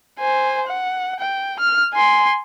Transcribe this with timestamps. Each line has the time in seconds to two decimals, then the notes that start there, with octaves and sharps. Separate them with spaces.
0.19 C5 G#5
0.68 F#5
1.20 G5
1.60 F6
1.94 G#5 C6